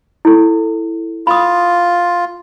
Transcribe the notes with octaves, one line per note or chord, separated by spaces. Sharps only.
E4 A4
F4 B5 D#6